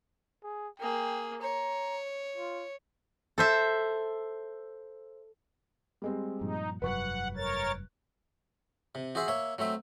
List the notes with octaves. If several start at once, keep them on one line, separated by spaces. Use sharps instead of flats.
G#4
A#3 G#4 G5
C#5 A#5
F4
A4 C5 E5
G3 G#3 C4
G2 A#2 F3 D#4
F1 G2 F#3 B4 F#5 C#6 F#6
A#4 C#5 A6
C3
F#4 G#4 C5 E5 F#5
A#3 C#5 E5
F#3 A3 C4 E5